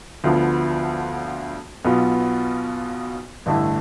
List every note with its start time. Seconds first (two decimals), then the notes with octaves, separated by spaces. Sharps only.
0.24 D2 D3 F3 B3 F4
1.84 B1 B2 B3 F4
3.46 A1 G2 D3 A3 E4